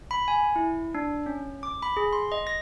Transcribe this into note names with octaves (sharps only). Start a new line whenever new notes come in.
B5
G#5
E4
D4
C#4
D6
B5
G#4
C6
D#5
A#6